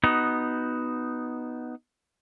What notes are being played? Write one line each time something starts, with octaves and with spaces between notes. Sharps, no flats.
B3 D#4 F#4